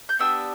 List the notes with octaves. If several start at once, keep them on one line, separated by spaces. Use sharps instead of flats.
G6
B3 D4 G4 B5 E6